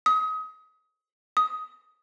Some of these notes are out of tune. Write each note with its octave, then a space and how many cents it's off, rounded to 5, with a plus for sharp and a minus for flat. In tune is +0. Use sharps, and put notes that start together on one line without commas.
D#6 +30
D#6 +15